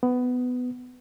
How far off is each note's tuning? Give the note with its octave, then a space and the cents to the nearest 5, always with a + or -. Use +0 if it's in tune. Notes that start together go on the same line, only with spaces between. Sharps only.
B3 +15